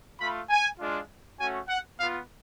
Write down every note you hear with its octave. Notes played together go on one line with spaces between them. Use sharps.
A3 F4 B5
G#5
G#3 D4 F4
A3 C#4 F#4 G#5
F#5
B3 F4 F5